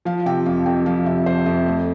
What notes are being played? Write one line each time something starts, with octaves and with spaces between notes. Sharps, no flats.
F3 F5
C3 G5
F2 F5
F2 G5
F3 F5
C3 E5
F2 C5
F2 E5
A3